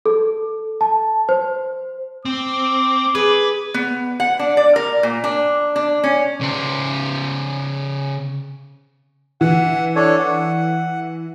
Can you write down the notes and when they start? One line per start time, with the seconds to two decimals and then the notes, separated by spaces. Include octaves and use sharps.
0.06 A4
0.81 A5
1.29 C5
2.25 C4 D6
3.15 G#4 B4
3.74 B3
4.20 F#5
4.39 D4
4.57 D5
4.76 A#4
5.03 A#2
5.24 D4
5.76 D4
6.04 C#4
6.41 C#3 C5
9.41 E3 F#5
9.96 D4 A4 C#5
10.18 F#5